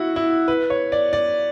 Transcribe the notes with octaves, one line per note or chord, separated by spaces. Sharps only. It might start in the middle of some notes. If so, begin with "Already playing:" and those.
Already playing: E4 F#4
E4
B4
C#5
D5
D5